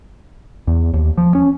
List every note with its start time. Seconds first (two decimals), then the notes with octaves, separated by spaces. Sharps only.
0.67 E2
0.94 D#2
1.18 F3
1.35 C#4